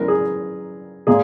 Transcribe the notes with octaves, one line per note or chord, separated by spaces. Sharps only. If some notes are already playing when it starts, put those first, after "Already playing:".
Already playing: F#2 E3 G#3 B3 A#4 B4
G#4
A#2 G#3 G#4